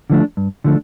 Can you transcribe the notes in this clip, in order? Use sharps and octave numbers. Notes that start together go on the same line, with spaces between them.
D3 F3 A3 D4
G2
D3 F3 A3 D4